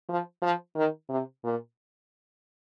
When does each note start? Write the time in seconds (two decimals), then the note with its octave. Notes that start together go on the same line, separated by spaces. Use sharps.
0.08 F3
0.42 F3
0.75 D#3
1.09 C3
1.44 A#2